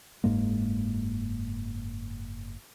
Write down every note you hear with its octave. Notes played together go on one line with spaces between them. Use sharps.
F#1 G#2 G#3 A#3